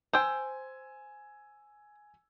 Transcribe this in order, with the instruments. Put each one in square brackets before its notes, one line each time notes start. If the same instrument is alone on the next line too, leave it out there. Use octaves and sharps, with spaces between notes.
[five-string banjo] C5 G5 [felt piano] G#5 E6